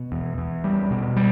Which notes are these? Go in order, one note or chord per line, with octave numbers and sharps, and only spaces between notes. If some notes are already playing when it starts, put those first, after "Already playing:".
Already playing: B2
E2
E2
G3
B2
G3